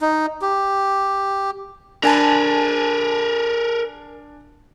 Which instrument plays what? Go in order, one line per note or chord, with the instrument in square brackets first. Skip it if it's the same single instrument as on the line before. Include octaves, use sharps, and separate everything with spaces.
[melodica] D#4
G4
[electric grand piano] D4 G#5 A5 [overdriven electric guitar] A#4 B4